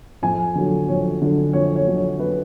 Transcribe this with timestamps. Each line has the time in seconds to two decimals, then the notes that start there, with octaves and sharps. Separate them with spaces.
0.22 F2 G#5
0.55 D3 F#3
0.88 F2 C#5
1.22 D3 F#3
1.53 F2 C#5
1.76 C#5
1.87 D3 F#3
1.97 C#5
2.20 B4